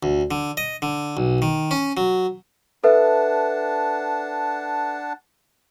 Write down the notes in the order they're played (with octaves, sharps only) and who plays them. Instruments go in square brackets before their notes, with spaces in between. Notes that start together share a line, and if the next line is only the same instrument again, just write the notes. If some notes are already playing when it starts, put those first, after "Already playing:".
[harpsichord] D2
D3
D#5
D3
B1
D#3
C#4
F#3
[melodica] D4 F#5 A5 [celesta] A4 B4 E5